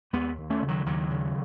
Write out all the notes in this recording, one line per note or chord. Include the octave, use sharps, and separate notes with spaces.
D#2 G#3 B3
D#2
A3 C#4
C#3
D#3 F#3
D#2 D#3 F#3
C#3